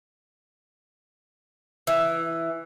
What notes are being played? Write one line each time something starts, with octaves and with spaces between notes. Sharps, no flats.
E3